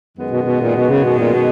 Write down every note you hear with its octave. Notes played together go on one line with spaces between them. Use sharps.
F#2 D#3 G#3 B3
B2
B2
A#2
B2
C#3
B2
A#2
B2